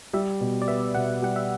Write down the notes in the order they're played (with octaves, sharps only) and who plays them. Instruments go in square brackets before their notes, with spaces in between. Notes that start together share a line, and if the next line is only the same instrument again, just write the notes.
[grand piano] G3 [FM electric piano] E5
[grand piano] B2
[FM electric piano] D5
[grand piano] B3 [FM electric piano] E5
[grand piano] B2 [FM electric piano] F#5
[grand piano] G3 [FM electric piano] F#5
[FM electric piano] E5